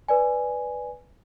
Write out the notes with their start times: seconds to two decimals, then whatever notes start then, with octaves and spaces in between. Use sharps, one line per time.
0.08 B4 D5 G#5